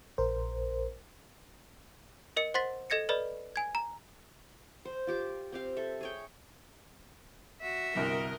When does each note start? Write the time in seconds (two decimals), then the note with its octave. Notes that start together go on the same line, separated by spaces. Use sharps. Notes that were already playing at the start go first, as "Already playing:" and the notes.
0.18 A#1 A#4 C5
2.37 A#4 D#5 C#7
2.54 C5 F#5 C6 A6 B6
2.90 A4 D#5 G#6 A#6 C#7
3.09 A4 B4 D5 D#5 B5
3.56 G#5 G#6
3.75 A#5
4.85 C5
5.07 F4 G4 D6
5.52 C4 G4 F5
5.76 A4 E5
6.01 G#4 C#5 G5
7.61 F#4 E5
7.95 G1 C2 A#4 D#5